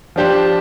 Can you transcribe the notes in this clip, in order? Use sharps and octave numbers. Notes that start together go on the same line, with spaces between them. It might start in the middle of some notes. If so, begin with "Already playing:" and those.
F3 D4 G4 C5